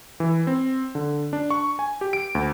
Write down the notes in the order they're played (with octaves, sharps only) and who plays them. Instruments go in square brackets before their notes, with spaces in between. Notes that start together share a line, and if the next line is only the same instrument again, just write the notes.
[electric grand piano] E3
C4
D3
D4
C#6
G#5
G4
D7
D2